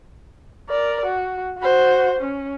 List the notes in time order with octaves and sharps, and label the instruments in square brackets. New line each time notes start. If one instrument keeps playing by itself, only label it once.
[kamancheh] A#4 D5
F#4
F#4 C5
C#4